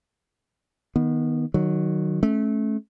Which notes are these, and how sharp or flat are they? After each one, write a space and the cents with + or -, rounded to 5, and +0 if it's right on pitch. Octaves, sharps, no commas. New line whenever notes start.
D#3 +10 B3 -15
D#3 -20 F#3 +0
A3 -25 C#4 -15